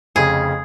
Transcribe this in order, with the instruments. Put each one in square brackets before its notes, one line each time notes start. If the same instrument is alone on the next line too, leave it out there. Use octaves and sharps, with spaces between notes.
[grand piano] F1 F2 C#3 [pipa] G#4